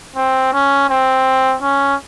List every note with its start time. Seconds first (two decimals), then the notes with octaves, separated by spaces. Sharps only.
0.16 C4
0.53 C#4
0.89 C4
1.62 C#4